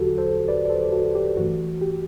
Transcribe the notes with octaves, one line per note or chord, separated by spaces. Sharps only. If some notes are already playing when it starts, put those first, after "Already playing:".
Already playing: E2 D3 F#3 F#4 G4 A4
A4 C5
B4 D5
D5
A4 C5
F#4 A4
G4
G2 E3 A3 F#4
G4